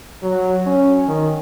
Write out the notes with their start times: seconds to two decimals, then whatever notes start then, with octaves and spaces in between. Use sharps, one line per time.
0.23 F#3
0.66 C#4
1.07 D#3